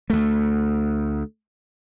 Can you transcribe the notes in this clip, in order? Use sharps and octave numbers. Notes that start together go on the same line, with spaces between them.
D2 A3